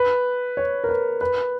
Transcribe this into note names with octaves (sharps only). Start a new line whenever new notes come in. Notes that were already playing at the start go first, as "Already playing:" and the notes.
Already playing: B4
C#5
A#4
B4
B4